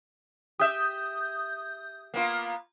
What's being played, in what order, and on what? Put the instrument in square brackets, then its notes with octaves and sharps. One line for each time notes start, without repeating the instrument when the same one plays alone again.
[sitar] G4 E5 [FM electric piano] D#6 G6
[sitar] A#3 B3 F4